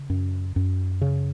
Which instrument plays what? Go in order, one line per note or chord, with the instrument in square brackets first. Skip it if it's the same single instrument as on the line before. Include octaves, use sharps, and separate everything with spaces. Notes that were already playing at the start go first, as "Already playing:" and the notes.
Already playing: [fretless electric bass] C#3
F#2
F#2
C#3